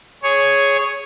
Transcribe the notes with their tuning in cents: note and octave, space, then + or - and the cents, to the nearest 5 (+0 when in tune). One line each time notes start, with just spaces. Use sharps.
G#4 +0 C#5 +0